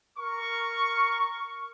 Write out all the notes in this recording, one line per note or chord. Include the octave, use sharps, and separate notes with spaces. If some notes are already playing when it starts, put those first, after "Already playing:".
A#4 C#6